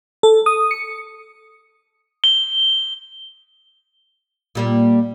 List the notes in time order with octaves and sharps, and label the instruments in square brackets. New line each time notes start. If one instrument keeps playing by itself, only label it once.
[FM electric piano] A4
D#6
C#7
[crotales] G7
[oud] A#2 G3 A#3